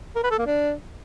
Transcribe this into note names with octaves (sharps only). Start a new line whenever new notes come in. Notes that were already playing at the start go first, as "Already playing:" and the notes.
A#4
B4
A4
A#3
D4